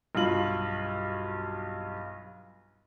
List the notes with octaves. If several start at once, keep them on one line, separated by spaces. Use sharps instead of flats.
B1 G2 F4 F#7